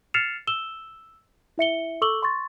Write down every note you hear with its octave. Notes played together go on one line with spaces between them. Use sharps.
F6 A6 C7 C#7 E7 F7
E6 E7 G7
E4 E5 C#7 G7
A4 C#6 D6 E6 F#7 G7
C6 C#6 A6